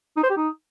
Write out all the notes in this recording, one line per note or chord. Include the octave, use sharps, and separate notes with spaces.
D#4
C5
G4
D#4